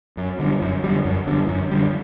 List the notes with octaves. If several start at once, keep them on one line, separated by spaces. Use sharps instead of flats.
F#2
D3 G3
F#2
D3 G3
F#2
D3 G3
F#2
D3 G3